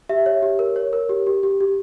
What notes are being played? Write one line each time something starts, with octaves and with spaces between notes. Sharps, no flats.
G4 E5
C#5
G4
A#4
C#5
A#4
G4
G4
G4
G4